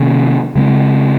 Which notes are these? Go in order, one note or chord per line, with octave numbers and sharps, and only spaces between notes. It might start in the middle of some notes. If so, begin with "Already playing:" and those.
Already playing: C3 D#3 A#3 C#4
C#3 G#3 C4